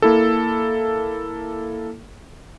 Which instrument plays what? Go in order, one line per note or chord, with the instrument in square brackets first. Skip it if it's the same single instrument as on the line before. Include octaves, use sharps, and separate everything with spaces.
[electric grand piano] A#3 E4 A4